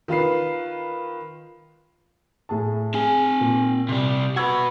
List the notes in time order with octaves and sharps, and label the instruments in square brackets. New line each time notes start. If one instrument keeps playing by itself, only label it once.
[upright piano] D#3 F4 B4 C7
A2 G#4 A5
[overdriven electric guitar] C4 G#5 [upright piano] G#4
[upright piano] A#2
[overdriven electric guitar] C3 G3
[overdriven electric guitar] F#4 B4 [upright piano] C#6 E6 G#6